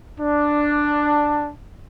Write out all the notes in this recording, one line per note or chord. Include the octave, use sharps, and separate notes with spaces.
D4